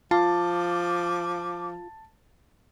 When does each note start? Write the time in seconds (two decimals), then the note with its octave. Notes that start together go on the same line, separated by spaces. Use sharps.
0.11 F3 F4 A5 D6